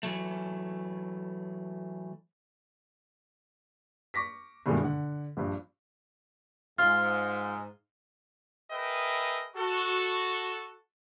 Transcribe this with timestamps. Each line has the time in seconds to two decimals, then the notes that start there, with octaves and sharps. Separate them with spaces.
0.03 E3 F#3 A3
4.14 C#6 D6 A#6 B6
4.66 G2 B2 D#3 G#3 A3
4.82 D3 F#5
5.37 A#1 G2
6.79 G#2 F4
8.72 G#4 A#4 B4 D#5 E5 G5
9.56 F#4 A4